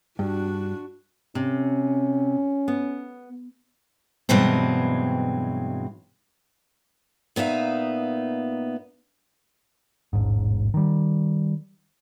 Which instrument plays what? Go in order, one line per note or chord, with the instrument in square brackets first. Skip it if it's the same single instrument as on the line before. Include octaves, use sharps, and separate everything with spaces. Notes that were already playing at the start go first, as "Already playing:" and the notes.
[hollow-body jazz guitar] G2 [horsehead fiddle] D4 F#4
[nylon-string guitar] C3 [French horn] C#4
[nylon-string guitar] B3
[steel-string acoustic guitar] G2 B2 E3 F#3 G#3 C4
A#2 B3 D#4 E5 F5
[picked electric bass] E1 A1 G#2
D#3 G3